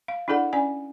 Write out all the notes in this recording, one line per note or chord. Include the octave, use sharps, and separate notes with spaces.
F5
D4 E4 G#4 A4 D5 F#5
C#4 D5 G#5